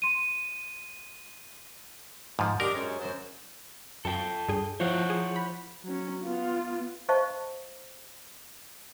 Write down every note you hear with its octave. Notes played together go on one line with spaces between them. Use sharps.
C6 D#7
G#2 F3
D4 D#4 G4 A#4
F#2 G#3 C#4
F#2 F#3 C5
F#2 A4 G5
G2 G#4
F3 E4 C5 C#5 F#5
G#4
B5
F#3 C#4
B3 F4
C5 D#5 F5 A5 C#6